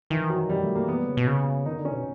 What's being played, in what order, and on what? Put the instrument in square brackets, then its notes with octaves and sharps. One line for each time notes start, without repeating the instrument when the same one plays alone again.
[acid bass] D#3 [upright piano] E3
[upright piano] F#3
G3
A3
A#3
[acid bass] E3 [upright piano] B3
[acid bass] G3
C#3
B2
C#3
[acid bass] D#3 [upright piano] D#4
[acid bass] D3
[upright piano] C#4
[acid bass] B2